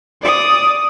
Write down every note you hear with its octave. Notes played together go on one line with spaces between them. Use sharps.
D5 D#6